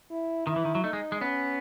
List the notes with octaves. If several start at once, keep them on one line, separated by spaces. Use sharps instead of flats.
E4
D#3 E4
E3
D#3
F#3
A3 D#4
G#3
G#3
B3 C#4